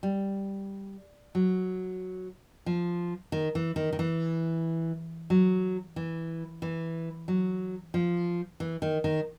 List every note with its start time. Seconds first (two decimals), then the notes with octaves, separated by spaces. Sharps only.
0.03 G3
1.35 F#3
2.66 F3
3.32 D#3
3.55 E3
3.76 D#3
3.93 D#3
3.99 E3
5.30 F#3
5.96 E3
6.62 E3
7.28 F#3
7.94 F3
8.60 E3
8.82 D#3
9.04 D#3